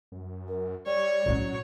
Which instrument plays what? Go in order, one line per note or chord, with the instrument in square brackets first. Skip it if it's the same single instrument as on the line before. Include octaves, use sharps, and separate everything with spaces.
[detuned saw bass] F#2
[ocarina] A#4
[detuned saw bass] G3 [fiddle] C#5 [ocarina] D5
[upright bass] A2 C#4 [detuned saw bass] F#3